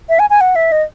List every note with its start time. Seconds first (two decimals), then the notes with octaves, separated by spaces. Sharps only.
0.09 E5
0.19 G#5
0.30 G#5
0.41 F#5
0.56 E5
0.72 D#5